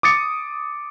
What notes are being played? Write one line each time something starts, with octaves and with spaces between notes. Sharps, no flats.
D6 D#6 A6 C#7